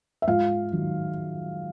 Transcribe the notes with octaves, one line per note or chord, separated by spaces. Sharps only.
E5
G#2 F4 F5
D#3 F#3